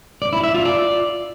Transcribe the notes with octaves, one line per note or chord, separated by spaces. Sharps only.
D5
E4
E5
F4
D5